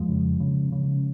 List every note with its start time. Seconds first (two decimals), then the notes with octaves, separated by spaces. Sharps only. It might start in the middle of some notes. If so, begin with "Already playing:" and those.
Already playing: F2 F3 G#3
0.09 C#3
0.40 C#3
0.72 C#3